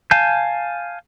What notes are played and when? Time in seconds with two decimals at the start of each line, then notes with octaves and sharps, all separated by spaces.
0.11 F5 G#5 A5 G6